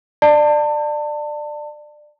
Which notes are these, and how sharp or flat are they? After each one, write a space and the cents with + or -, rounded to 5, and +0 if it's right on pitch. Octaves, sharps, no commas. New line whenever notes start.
D5 +20 A5 +30